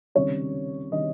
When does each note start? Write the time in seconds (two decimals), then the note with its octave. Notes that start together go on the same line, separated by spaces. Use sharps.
0.15 C#2 C3 D#3 G3 C#5
0.92 C3 D#3 G3 D#5